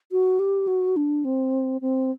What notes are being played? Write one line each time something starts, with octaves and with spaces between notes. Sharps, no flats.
F#4
G4
F#4
D4
C4
C4